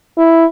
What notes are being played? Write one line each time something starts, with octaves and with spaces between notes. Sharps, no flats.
E4